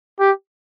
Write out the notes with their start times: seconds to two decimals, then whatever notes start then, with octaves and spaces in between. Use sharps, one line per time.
0.20 G4